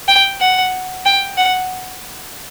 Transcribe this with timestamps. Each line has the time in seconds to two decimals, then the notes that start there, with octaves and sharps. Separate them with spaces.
0.08 G5
0.41 F#5
1.05 G5
1.37 F#5